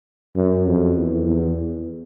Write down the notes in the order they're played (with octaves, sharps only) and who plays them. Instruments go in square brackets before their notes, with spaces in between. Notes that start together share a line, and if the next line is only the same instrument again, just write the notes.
[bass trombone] F#2
F2
E2
E2